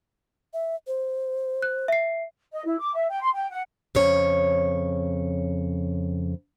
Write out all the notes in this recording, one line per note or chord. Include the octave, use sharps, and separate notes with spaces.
E5
C5
F#6
E5 C7
D#5
E4
D6
E5
G5
C6
G5
F#5
F2 C#3 C#5